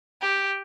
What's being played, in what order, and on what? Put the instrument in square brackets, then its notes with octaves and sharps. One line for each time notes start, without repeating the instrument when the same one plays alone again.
[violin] G4